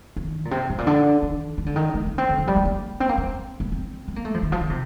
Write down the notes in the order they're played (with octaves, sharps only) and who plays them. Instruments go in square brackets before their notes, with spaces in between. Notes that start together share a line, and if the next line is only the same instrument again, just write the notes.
[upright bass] D#3
A#2
C3
A2
A#2
D3
D#3
D#3
D3
D#3
A3
A#3
C4
D3
F3
G3
A3
A#3
C4
A#3
C4
A#3
C4
C4
A#3
A3
F3
D#3
F3
D#3
C3